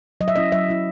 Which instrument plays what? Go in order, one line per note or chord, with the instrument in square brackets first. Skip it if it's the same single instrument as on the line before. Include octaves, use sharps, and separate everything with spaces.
[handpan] F#3 D#5
E5
C#4 E4 D#5
F#3 E5
C#4 E4